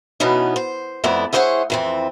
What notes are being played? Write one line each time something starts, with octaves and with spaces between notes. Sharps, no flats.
B2 E3 B3 C#4 D#4
C5
F2 A3 B3 E4 D5
E4 G#4 C5 C#5 D#5 F#5
F2 E3 C4